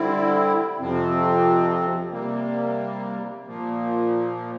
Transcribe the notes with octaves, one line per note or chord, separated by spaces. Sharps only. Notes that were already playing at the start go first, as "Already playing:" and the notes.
Already playing: D3 G3 C4 E4
F2 C3 F3 C4
C3 G3 A#3
A#2 F3 A#3